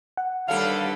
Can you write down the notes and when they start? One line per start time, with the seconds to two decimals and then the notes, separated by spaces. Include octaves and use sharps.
0.17 F#5
0.48 D#2 D3 G3 A4 B4 F5